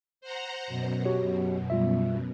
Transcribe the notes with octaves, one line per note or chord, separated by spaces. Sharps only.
C5 F#5 A#5
F#2 B2
F#4 G4 C#5
G3 F4 E5